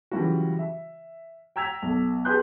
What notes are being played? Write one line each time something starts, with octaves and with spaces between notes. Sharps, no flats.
C#3 E3 F#3 G3 F4 F#4
E5
G5 A#5 E6 G#6 B6 F7
B1
G4 G#4 B4 C6 F#6 G6